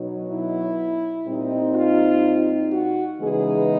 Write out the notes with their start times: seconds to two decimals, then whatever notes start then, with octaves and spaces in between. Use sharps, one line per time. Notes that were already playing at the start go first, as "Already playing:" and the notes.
Already playing: B2 F#3 B3 D#4
0.29 E4
1.26 A#2 G3 C4 D#4
1.75 F4
2.72 F#4
3.21 C#3 E3 G#3 B3 D#4 G#4